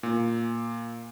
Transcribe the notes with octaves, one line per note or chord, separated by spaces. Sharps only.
A#2